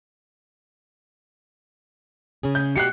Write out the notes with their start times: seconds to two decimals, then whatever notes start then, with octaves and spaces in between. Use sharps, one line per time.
2.43 C#3 C#4 G#4
2.55 G6
2.76 B2 F#4 G4 F#6 C7 C#7